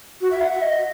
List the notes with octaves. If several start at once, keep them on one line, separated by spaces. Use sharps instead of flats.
F#4
E5
F#5
E5
D#5